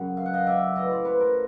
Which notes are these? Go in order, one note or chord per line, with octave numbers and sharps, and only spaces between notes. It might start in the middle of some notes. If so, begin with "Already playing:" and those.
Already playing: F#2 C#3 F#3
F5
F#5
D#5 F5
D5 E5
A2 E3 C#5 D#5
C5 D5
B4 C#5
A#4 C5